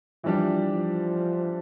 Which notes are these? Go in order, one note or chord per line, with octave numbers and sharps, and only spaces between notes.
E3 F3 G3 D4 G4
F3